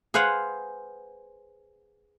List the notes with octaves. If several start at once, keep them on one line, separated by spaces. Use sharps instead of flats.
G#4 B4 C5 F5 F#5